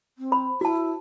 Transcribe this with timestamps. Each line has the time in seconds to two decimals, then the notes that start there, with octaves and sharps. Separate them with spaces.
0.18 C4
0.32 C5 B5
0.61 E4 F#4 A5